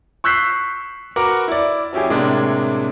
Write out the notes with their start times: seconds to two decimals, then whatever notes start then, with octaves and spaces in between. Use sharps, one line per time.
0.24 C#6 E6 F#6 G6 B6 C7
1.16 F#4 A#4 B4 F#5 A#5 D6
1.48 E4 D5
1.93 F#3 C#4 E4 G4 G#4
2.10 A2 C3 G#3 A#3 D4